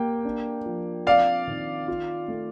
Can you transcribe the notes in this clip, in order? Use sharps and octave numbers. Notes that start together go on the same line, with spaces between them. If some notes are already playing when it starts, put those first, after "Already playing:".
Already playing: A#3 G4 G5
D4
F3
C4 D5 F5
D#3
F4
A3